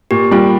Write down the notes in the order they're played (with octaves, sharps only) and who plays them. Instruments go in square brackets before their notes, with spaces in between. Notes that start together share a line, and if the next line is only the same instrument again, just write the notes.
[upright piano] A#2 [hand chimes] G4
[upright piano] G3 [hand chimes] F4